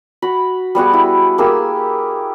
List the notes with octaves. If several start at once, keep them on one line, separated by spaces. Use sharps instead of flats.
F#4 B5
G3 B3 F#4 G#4
E4
A#3 G4 G#4 E6